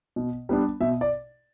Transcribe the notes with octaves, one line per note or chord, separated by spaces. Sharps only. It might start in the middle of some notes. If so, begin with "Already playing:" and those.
B2
G3 B3 D4
B2 E5
D5